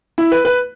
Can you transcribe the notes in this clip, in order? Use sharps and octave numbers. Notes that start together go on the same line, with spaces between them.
E4
B4
B4